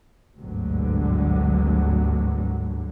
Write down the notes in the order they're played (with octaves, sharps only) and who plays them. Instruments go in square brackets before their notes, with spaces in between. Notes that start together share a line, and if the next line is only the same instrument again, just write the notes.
[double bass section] G#1 D2 G2 B2 D3 F#3